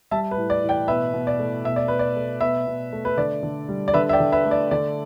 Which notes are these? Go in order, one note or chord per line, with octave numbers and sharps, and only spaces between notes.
G3 E5 A5
B4
A2
D5
E3
D5 G5
B2 B4 E5
B2
D5
A3
B2 E5
D5
B2 B4
D5
A3
B2 B4 E5
B2
A3
B4
D3 D5
D3
G3
D5
D3 B4 E5
E5
D5 G5
D3
B4 E5
A3
D5
D3 D5